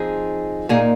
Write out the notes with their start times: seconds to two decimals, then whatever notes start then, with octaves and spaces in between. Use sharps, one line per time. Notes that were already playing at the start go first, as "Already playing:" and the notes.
Already playing: F3 C4 D#4 G#4
0.69 A#2 A#3 D#4 G#4